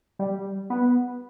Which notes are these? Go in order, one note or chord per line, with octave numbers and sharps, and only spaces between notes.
G3
B3